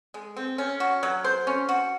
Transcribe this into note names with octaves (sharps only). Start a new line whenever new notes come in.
G#3
C4
C#4
F#4
F#3
C5
C#4
F#4